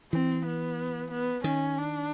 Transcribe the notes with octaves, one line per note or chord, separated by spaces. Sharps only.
E3 C4
B3
B3
D#3 C#4
D4